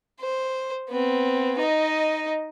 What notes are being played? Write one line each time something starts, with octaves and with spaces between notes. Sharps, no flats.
C5
B3 C4
D#4 D#5